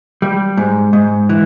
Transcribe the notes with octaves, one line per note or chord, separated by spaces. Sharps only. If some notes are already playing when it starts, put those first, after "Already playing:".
G3
G#2
G#2
E3